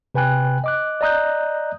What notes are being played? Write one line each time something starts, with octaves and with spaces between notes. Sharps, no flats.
C3 B4 G5 G#5 F#6
D#5 D6 F#6
D5 D#5 A#5 D#6 F#6 G6